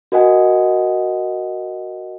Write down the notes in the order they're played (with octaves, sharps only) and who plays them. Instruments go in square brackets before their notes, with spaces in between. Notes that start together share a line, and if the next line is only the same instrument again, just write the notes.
[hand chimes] F#4 A#4 D#5 F#5 G#5